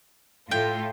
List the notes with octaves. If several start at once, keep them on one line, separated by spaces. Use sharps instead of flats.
A2 F4 A4 G5